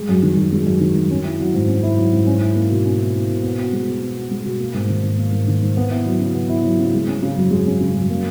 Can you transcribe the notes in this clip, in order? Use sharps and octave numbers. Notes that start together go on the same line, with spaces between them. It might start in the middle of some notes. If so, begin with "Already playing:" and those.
Already playing: G#3
F#2
D#3
F#2
G#3
F#2
D#3
F#2
C#4
E4
F#3
G#2
C#4
E4
F#3
G#2
C#4
E4
A#3
B2
C#4
E4
A#3
B2
B3
F#4
G#3
B2
B3
F#4
G#3
B2
A#3
G#2
D#3
G#2
A#3
G#2
D#3
G#2
B3
E4
F#3
C#3
B3
E4
F#3
C#3
G#3
C#4
C#3
F#2
G#3
C#4
C#3
F#2
A#3